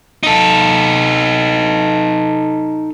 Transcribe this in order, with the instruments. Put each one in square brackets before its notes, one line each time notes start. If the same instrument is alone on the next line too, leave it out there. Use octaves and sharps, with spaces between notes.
[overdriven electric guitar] D#4 A4